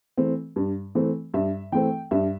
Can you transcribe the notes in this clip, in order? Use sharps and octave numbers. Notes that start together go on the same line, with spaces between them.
E3 A3 C4
G2
E3 A3 C4
G2 E5
E3 A3 C4 G5
G2 E5